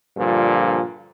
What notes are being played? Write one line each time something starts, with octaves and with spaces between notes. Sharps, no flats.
G2 A#2 D3 F3